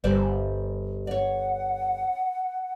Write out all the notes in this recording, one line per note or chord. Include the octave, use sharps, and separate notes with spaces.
G1 G3 C5 D5
C#5 D5 F#5